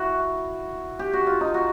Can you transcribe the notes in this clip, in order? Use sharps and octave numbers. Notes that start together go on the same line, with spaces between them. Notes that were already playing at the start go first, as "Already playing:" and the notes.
Already playing: E4 F#4
G4
F#4
F4
D#4
F#4